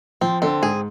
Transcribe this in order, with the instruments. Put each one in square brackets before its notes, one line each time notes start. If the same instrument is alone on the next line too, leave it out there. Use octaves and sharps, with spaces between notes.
[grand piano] F3 [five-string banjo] C4
[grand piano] D3 [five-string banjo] C4
[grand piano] G#2 [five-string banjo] G#4